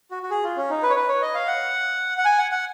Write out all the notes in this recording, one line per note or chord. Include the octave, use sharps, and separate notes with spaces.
F#4
F#4
G#4
F4
C#4
D#4
B4
C#5
B4
C#5
D#5
F5
F#5
F#5
G#5
F#5
F#5